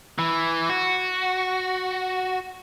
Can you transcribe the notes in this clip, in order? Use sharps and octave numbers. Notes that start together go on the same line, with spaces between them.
E3
F#4